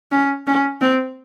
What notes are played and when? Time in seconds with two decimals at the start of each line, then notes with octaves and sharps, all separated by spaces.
0.12 C#4
0.47 C#4
0.81 C4